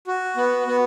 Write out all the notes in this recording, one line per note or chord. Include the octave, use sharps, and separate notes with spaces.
F#4
B3
B3